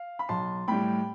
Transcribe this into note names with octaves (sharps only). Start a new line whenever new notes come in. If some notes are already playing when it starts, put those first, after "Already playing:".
Already playing: F5
B5
B1 A5 C6
A2 G3 G5 B5